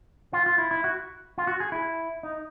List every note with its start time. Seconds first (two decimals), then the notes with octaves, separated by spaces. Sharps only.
0.33 F4
0.46 F4
0.58 E4
0.71 E4
0.84 F#4
1.38 F4
1.47 F#4
1.60 G#4
1.72 E4
2.23 D#4